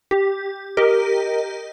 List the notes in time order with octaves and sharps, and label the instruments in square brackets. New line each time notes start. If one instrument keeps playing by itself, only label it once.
[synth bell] G4
G4 A#4 D#5